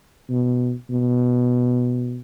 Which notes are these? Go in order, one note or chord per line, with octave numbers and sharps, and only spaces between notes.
B2
B2